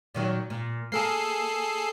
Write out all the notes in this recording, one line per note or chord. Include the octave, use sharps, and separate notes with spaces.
A#2 D#3 F#3
A#2
A#3 G#4 A4 C7